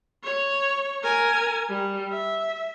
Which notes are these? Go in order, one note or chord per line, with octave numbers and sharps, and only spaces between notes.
C#5
A#4 G#5
G3
E5